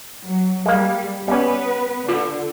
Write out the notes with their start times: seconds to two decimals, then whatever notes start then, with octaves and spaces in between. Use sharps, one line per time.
0.23 F#3
0.66 G3 G#3 A#3
1.28 G3 B3 C#4 B4
2.09 D3 F4